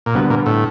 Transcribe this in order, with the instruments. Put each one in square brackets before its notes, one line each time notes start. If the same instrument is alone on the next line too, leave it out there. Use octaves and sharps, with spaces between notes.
[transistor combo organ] A#2
[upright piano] D2 D3 G3 B3 [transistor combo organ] B2
[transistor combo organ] A#2
A2